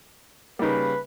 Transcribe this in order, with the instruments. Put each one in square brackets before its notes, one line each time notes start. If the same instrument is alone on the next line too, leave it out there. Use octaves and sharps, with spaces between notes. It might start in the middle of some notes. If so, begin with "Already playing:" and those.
[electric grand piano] C#3 G3 [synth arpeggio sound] A#3 D#4 [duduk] B4